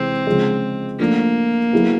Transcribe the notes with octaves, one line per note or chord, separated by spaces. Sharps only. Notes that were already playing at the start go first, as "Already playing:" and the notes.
Already playing: C3 E3 G#3 C4
C#3 F3 G#3
F3 A3 A#3 D4 F4
F#3 B3 E4 G#4